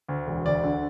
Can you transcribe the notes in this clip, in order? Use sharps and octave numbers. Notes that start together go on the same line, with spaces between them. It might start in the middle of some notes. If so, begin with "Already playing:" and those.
D2
E1
D2 D5
D3